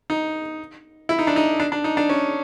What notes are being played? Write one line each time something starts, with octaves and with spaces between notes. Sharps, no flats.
D#4
E4
D#4
D4
D#4
D4
D4
D#4
D4
C#4